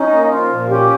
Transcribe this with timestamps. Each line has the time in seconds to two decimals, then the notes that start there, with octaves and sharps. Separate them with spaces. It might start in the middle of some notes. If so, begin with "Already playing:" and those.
Already playing: C#4 D#4
0.11 A#3
0.30 F3 F4
0.49 A#2
0.68 C#4 G4